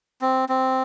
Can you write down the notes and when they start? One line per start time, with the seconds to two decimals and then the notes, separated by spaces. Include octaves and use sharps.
0.21 C4
0.49 C4